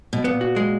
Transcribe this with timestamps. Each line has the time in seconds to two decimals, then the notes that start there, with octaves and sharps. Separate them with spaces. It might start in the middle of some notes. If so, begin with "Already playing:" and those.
0.13 B2
0.24 A#2 B3
0.41 F#4
0.56 G#3